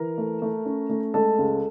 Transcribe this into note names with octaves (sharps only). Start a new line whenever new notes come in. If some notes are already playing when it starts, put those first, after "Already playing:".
Already playing: E3 A#4 A#5
A3
A3
C#4
A3
G#3 A4 A5
C#2